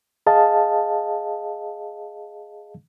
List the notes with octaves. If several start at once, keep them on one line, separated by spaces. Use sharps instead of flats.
G#4 D#5 F5 A5